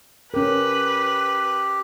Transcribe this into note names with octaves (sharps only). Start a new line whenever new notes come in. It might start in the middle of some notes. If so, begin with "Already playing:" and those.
C#4 G4 A#4 B4